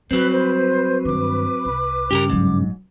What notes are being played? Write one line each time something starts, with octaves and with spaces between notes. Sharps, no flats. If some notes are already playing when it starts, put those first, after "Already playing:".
F#3 G3 C4 B4
B4 C5
G2 D#3 D6
C2
G2 C#3 G4 G#4 A#4
D#1 G#2 F#3